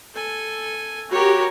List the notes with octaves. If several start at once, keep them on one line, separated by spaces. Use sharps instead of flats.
A4 G#5
F#4 G4 A#4 C#5